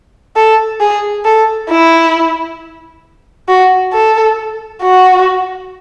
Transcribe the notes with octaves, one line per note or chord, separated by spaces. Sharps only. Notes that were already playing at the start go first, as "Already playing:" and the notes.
A4
G#4
A4
E4
F#4
A4
F#4